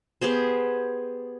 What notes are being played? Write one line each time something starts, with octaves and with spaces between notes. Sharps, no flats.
B3 G4 G#4 C5